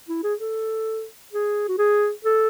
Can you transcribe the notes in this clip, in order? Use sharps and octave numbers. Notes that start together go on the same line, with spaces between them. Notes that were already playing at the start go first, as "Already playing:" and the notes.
E4
G#4
A4
G#4
F#4
G#4
A4